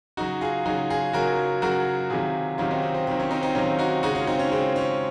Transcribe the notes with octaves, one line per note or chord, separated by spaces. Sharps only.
C#3 F#3 D#4 F#4
F4 G#4
C#3 F#3 D#4 F#4
F4 G#4
C#3 F#3 F#4 A#4
C#3 F#3 F#4 A#4
C3 D#3 F#3 F4 G#4
C3 D#3 F#3 C#4 F4
C4 D#4
C4
C4
C3 D#3 F#3 C4
C#4
C4 D#4
C4 D#4
C3 D#3 F#3 C#4 F4
D#4 F#4
C#3 G#3 D#4 F#4
C#4 F4
C4 D#4
C#4
C#3 G#3 C4
C#4